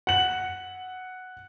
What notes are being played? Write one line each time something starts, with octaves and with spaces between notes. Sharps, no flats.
F#5 F#7